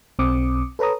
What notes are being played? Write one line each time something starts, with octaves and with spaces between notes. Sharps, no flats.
B1 C4 D6 D#6 C#7
A4 B4 C#5 A#5 D#6